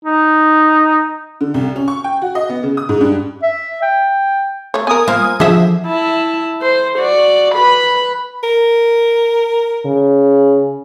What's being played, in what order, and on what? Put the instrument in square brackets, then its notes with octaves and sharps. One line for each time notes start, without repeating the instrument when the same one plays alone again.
[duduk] D#4
[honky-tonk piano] D3
C2
C#4
C#6
G5
F#4
D#5
B3
C#3
D#6
G#2
G2
[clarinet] E5
G5
[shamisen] A3 C#5
[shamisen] B3 A#4 [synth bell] G#5 D#6
[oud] A#3 [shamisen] F4 C5
[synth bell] F3 [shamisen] D4 F4 F#5 [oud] G#4 E5
[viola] E4 A5
C5
F#4 D5
B4 B5
[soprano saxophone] A#4
[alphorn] C#3